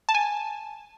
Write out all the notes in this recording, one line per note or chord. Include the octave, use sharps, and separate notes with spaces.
A5
G#5